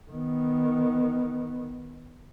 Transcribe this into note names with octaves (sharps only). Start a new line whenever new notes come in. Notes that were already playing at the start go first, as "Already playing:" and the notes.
D#3 B3